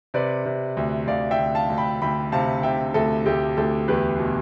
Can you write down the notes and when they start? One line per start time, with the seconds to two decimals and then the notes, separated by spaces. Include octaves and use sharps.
0.14 C3 B4 D5
0.45 C3
0.77 D2
1.07 D2 D5 F5
1.31 E5 G5
1.39 D2
1.55 F5 A5
1.70 D2
1.78 G5 B5
2.02 D2 G5 B5
2.32 C3 F5 A5
2.63 C3 E5 G5
2.94 D2 A4
3.26 D2 G4
3.57 D2 A4
3.88 E2 G4 B4
4.19 B2